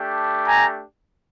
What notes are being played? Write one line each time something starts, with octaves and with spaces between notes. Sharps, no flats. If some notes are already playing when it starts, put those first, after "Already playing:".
Already playing: A3 D4 G4
G#5 A#5